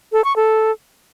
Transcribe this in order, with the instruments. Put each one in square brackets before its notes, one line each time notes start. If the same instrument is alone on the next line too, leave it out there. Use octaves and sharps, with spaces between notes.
[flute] A4
C#6
A4